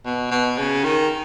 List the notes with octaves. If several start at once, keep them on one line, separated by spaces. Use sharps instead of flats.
B2
B2
C#3
D#3